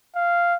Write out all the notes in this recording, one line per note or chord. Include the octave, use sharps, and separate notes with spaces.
F5